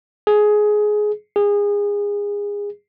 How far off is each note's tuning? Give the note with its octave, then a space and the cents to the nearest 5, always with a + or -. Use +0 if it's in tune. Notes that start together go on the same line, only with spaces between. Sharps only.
G#4 +15
G#4 -25